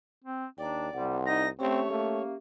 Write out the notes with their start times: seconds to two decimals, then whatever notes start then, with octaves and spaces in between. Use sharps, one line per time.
0.24 C4
0.58 D#2 D4 D5 G5 A#5
0.93 C2 G3 F#5 C6
1.26 D#4 A#6
1.59 A3 C4 C#4 G4 C#5 E5
1.90 A3 A#3